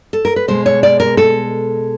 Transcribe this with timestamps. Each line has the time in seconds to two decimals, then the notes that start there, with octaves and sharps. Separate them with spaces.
0.13 A4
0.25 A#4
0.36 B4
0.48 B2 G#3 C5
0.66 C#5
0.83 D5
1.00 A#4
1.17 A4